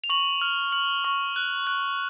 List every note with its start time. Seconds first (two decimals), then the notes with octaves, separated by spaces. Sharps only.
0.04 F7
0.10 C#6 F#7
0.41 F6
0.72 F6 F#7
1.04 C#6
1.36 F#6
1.67 F#6